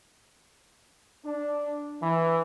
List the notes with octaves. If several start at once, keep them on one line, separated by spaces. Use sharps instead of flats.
D4
E3